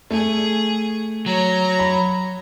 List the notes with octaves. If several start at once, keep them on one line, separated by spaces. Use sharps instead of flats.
A3 G#4
F#3 C#5 A#5
B5